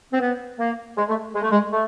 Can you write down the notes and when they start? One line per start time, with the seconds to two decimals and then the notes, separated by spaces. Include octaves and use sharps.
0.12 C4
0.20 B3
0.58 A#3
0.97 G#3
1.09 A3
1.34 G#3
1.42 A3
1.50 G#3
1.72 A3